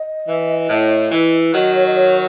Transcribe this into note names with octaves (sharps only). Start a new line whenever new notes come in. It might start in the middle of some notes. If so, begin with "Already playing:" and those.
Already playing: D#5
E3
A2
E3
D#3 F#3 D#5
C#5
D#5
C#5